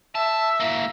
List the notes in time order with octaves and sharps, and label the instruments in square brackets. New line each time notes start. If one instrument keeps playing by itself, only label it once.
[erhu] E5 [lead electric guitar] A5
[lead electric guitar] A#3 E4